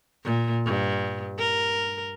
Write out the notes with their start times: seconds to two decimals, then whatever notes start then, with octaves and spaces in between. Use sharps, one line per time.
0.24 A#2
0.65 G2
1.38 A#4